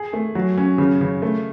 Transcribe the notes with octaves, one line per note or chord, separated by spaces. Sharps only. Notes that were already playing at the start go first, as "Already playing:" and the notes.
Already playing: G#4
A3
F#3
C#4
C#3
C#3
A3